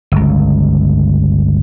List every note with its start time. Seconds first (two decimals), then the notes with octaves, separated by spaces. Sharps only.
0.12 G1 C#2